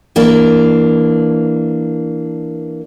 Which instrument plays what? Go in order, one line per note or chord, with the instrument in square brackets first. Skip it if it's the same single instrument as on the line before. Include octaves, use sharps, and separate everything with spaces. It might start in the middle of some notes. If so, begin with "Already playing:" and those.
[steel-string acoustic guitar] E3 A#3 D4